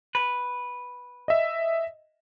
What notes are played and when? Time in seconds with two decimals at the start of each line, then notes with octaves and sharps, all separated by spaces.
0.15 B4
1.28 D#5 E5